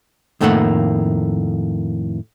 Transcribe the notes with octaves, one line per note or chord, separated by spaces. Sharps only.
F2 A2 D#3 A3 A#3 F#5